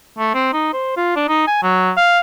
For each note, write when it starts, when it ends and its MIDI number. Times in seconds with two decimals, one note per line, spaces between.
0.19 0.34 57
0.34 0.52 60
0.53 0.73 63
0.73 0.97 72
0.97 1.15 65
1.16 1.24 62
1.28 1.42 63
1.47 1.61 80
1.63 1.91 54
1.97 2.20 77